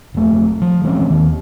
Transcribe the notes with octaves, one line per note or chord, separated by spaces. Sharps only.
E1 A3
F3
E3 G#3 C4 C#4
D#2 D#3